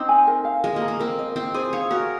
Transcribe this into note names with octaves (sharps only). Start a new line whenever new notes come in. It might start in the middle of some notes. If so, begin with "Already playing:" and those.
Already playing: C4 D#4
G#5
A#4
F5
G#3 A#4
A#3
A#5
A#3
C4 A#4
D#5
C4 D#4
G#4 C5
C#5 F5
F#4 A#4